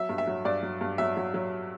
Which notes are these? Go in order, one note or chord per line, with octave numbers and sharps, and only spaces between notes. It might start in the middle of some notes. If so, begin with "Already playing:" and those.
Already playing: F#3 E5
G2
E5
F#3
G2 D5
F#3
G2
F#3 E5
F#3
F#3